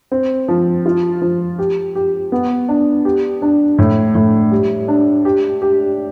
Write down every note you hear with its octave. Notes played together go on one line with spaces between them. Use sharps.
C4
F3
F4
F3
G4
G4
B3
D4
G4
D4
A2
A2
G3
D4
G4
G4